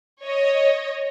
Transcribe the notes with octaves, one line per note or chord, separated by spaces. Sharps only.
C#5 D#5